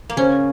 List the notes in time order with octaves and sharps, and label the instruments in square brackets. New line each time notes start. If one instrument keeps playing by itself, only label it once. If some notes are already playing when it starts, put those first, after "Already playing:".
[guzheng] A#3
[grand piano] C#3 [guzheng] C#4